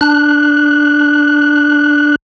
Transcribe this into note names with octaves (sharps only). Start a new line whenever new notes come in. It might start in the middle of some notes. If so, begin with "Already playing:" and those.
D4 F#6